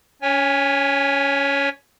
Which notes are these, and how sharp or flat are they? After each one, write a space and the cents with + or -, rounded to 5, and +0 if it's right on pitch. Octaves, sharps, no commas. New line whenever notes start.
C#4 +25 C#5 +0 G#5 -25